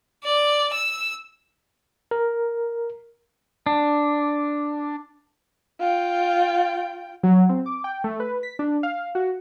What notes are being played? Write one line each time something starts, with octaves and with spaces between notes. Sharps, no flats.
D5
E6
A#4
D4
F4 G5
F#3
C4
D6
G5
A3
B4
B6
D4
F5
F#4